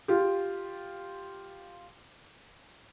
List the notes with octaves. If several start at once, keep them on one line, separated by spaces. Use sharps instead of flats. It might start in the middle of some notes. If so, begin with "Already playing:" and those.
F4 G4